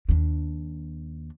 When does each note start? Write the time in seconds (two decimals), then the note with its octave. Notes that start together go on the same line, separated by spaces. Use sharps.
0.09 D#2 D4